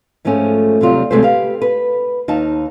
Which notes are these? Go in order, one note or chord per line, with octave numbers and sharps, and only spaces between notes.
G#2 F3 G#3 A3 C#4
D#2 C3 F#3 G3 F4
D2 C3 G#3 A3 B4 C5
G4 B4 F5
B4
D#2 D#4 F5 A5